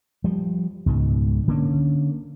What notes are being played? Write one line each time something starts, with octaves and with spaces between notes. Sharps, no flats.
F3 G3
C#2 G#2 B2
D3 A#3 C#4